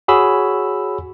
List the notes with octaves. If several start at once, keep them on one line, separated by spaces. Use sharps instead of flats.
F#4 G#4 C#5 B5 E6